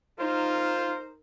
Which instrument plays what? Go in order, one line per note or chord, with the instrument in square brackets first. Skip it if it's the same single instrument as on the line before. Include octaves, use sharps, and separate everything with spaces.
[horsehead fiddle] D#4 A#4 [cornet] F4 [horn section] C5